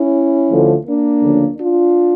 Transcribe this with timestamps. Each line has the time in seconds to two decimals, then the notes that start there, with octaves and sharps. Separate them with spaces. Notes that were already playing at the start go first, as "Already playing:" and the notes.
Already playing: C#4 E4
0.49 D2 D3 F3 A3
0.85 A#3 D4
1.21 D2 C#3 F3
1.57 D4 F4